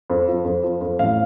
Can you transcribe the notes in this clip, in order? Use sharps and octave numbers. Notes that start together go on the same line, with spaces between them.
F2
F3
F2
F3
F2
A1 F5